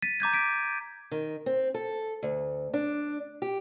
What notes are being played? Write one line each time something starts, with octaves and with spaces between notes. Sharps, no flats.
A6 B6 D#7
A#5 D6 G6 G#6
B6 D7
D#3
C4
A4
D2
D4
G4